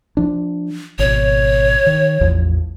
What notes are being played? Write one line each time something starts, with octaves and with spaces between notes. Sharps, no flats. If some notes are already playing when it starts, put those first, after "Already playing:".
F3 D4
G#1 B2 C#5
D#3
A1 E2 F3